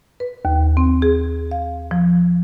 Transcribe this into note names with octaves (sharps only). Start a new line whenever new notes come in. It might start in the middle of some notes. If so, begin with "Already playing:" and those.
B4
D#2
C4
G#4
F5
F3